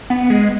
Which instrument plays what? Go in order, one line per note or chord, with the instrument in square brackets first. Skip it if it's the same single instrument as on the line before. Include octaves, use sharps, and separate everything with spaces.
[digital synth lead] B3
G#3